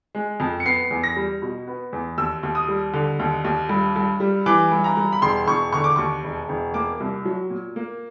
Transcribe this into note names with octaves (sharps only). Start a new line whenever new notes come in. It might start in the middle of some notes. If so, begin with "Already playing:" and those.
G#3
F2
C#7
B3 C7
E2
A#6
G3
B2
B3
E2
D#2 E6
D#2
D#6
G3
D3
D#2
D#2
G2
G2
G3
E3 D6
G2
A#5
G2
B5
E1 C6
E1 C#6
D3 C#6
D6
D#2 C#6
E1
E1
A#3 D6
C2
F#3
A#2
A#3